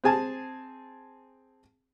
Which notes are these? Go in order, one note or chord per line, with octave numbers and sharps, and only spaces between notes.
C4 G#4 G#5 A5